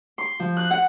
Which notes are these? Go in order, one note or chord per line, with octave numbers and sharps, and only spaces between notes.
C6
F3
F#6
F#5